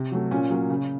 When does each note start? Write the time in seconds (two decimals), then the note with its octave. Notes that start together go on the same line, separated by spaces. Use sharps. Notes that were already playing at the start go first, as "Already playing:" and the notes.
Already playing: C3
0.12 F#3 A3
0.31 A#2 C#4
0.50 F#3 A#3
0.70 C#3